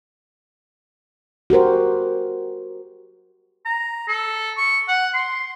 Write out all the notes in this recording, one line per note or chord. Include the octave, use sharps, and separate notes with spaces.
F#4 G4 A#4 C5
A#5
A4
C#6
F#5
C6